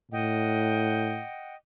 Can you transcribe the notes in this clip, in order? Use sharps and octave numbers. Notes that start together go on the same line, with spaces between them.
A2 D#5 F#5 G5